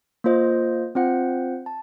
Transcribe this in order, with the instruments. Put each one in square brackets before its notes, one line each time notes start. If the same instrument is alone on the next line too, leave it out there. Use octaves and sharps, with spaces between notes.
[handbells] A#3 F4 C5 D#5
C4 F4 C5 F#5
A5